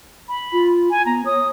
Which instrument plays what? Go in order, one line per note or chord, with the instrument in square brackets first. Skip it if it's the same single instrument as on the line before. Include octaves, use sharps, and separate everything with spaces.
[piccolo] B5
[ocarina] F4
[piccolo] G#5
[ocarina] B3 [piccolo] A#5
[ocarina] C#5 [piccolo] D#6